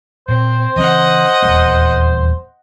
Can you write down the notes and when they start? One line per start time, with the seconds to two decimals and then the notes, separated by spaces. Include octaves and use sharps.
0.28 A#2 C4 C5
0.76 C#3 E3 C4 D#5 F#5
1.42 D#1 E2 A#3